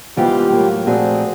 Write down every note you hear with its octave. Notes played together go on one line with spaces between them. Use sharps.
G#2 E3 G3 B3 F4 G4
A2 F#3 A#3
A#2 F3 A3 C4 F#4 G#4